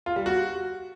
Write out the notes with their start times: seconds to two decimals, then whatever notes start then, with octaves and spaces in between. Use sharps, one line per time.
0.06 F4
0.16 G3
0.26 F#4